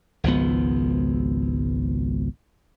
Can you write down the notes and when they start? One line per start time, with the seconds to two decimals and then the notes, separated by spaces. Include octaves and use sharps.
0.24 G#1 C#2 F3 B3